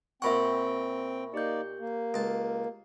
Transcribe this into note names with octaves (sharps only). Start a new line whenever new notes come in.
A#2 C4 E5 F#5 G5 B5 C#6
A#3 D#4 G4 D5 G6
A#3
C#2 A5